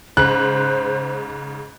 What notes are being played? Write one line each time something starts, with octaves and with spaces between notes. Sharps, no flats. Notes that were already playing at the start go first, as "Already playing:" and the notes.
G#2 C#3 C5 F#6